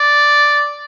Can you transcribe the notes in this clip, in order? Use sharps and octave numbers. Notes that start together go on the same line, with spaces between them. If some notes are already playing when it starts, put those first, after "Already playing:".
Already playing: D5